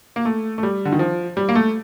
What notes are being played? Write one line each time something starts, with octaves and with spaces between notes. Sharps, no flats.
A#3
A3
A3
G3
D3
D#3
F3
G3
A#3
A3